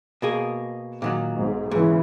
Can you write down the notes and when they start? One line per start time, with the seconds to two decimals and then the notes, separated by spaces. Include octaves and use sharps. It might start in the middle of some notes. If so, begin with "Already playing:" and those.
0.22 B2 A#3 G#4
1.02 A#2 D#3 F#3
1.35 B1 G#2
1.71 G#2 C#3 E3